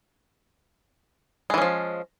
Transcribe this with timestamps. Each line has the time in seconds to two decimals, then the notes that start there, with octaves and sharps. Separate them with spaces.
1.50 G#3
1.54 E3
1.58 C#4
1.62 F3